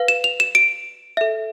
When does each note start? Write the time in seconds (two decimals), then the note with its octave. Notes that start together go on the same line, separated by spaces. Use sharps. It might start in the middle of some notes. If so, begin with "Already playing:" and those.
Already playing: B4 F5
0.08 E7
0.24 F7
0.40 E7
0.55 D7
1.17 A4 E5